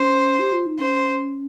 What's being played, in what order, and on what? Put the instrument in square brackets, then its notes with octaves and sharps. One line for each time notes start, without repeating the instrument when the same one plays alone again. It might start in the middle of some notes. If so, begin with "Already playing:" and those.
Already playing: [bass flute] C#4 [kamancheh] C5
[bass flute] G4
F4
D#4
[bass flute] C#4 [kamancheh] C5